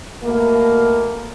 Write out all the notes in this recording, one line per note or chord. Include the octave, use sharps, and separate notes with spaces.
B2 A3 A#3